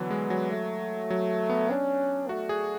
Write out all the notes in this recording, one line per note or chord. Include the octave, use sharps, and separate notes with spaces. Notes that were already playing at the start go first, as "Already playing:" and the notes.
Already playing: D3 E3 F#3 B3
G#3
F#3
A3
F#3
B3
C#4 D4
A3 F#4
G#4